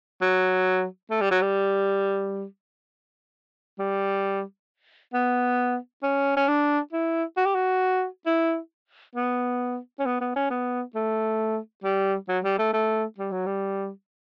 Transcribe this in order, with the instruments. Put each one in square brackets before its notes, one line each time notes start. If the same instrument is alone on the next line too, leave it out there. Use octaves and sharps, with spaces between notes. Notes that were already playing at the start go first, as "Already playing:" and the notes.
[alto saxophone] F#3
A3
G3
F#3
G3
G3
B3
C#4
C#4
D4
E4
F#4
G4
F#4
E4
B3
C#4
B3
B3
C#4
B3
A3
G3
F#3
G3
A3
A3
G3
F#3
G3